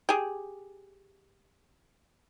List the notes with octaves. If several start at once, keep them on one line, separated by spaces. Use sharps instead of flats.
G4 G#4